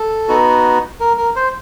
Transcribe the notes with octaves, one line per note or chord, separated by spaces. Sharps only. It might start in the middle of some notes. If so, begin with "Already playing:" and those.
Already playing: A4
B3 D#4 F#4
A#4
A#4
C5